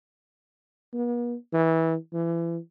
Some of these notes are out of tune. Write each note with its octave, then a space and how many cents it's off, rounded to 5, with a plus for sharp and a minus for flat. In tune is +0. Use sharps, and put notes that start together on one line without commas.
B3 -45
E3 -20
E3 +30